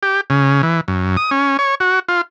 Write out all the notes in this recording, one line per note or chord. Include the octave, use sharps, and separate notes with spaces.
G4
C#3
E3
F#2
D#6
C#4
C#5
F#4
F4